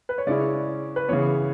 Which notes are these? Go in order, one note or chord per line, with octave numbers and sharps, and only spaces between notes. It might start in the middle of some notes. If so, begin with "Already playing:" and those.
B4
C#5
C#3 G#3 C#4 E4 D5
B4
C#3 E3 B3 C#5